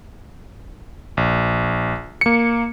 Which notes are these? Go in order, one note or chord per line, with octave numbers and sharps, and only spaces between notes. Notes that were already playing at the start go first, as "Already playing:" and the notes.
A#1
A#3 C#7